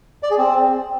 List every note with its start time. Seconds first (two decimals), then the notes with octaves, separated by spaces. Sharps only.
0.23 D5
0.30 G#4
0.38 C4